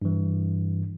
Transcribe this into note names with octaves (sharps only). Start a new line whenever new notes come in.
G2 E3